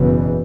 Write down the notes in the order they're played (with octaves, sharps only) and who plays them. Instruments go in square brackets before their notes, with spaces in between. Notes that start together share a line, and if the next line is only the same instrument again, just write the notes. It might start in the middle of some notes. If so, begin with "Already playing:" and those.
Already playing: [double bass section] F#1 E2 B2